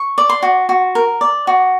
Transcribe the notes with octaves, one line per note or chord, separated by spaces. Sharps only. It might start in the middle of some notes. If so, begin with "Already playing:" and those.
Already playing: C#6
D5
C6
F#4
F#4
A#4
D5
F#4